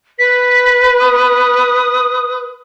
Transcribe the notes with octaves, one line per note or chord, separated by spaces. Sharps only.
B4 B6
D#6